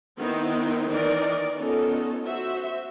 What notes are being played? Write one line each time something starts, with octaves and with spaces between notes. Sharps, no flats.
D#3 B3 C4 D#4 E4
D#3 E3 D#4 A#4 D5
B3 C#4 D#4 F4 A4
F#4 C5 E5